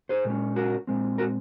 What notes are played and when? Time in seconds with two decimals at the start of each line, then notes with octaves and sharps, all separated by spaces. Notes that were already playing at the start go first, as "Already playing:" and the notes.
0.09 G#4 C5
0.25 A#2 G#3 C#4
0.56 F#4 A#4
0.87 A#2 G#3 C4
1.18 F#4 A#4